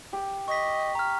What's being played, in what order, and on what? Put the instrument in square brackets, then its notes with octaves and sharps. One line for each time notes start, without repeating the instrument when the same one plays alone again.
[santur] G4
[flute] D#5 [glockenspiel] C#6 B6
[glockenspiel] A#5 F6